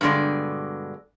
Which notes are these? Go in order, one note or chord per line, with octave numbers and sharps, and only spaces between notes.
G2 B2 D3 G#3 D5